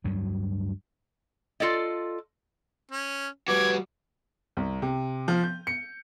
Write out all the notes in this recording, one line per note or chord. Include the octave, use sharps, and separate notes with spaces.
D2 G2 F#3
F4 A4 D5 D#5
C#4
G3 F#4 B4 D6 G#6
C2
C3
F3
G6
C#7